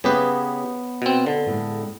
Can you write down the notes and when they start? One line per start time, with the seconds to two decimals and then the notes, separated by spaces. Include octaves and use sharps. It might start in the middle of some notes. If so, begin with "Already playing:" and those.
0.04 C#3 B3 G4 B4 C#5 D#5
1.02 B2 C4
1.26 D3
1.46 A2 G#3